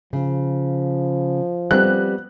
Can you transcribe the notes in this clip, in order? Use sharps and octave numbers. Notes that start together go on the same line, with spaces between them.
C#3 F3
G3 B3 C4 F#6